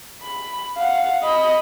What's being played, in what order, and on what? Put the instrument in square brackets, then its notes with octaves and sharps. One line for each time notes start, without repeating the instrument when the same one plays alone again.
[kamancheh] B5
F5 F#5
D#5 B5